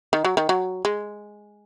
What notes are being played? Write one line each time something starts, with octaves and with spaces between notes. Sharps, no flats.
D#3
F#3
D#3
F#3
G#3